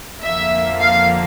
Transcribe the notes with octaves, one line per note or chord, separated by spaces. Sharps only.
F2 D3 F3 A#3 E5
F5